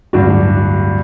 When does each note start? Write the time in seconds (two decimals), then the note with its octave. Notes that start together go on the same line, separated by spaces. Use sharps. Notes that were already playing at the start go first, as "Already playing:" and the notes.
0.13 D1 G2 G3 D4 F#4